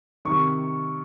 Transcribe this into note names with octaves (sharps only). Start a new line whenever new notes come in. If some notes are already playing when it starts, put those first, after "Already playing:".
C3 D#3 C#6